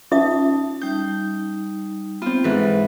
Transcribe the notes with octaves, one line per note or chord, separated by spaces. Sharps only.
C#4 D#4 F4 E5 A5
G3 D#4 G6
B3 C4 F4
G#2 E3 A4 B4